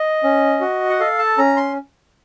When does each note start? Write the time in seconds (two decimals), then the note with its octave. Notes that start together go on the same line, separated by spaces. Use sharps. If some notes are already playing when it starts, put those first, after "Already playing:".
Already playing: D#5
0.24 C#4
0.61 F#4
0.90 F#5
1.00 A4 F5
1.19 A5
1.38 C#4 A#5
1.57 C6